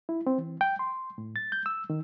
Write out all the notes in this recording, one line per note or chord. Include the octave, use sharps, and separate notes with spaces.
E4
C4
E3
G5
C6
A2
A6
G6
E6
D#3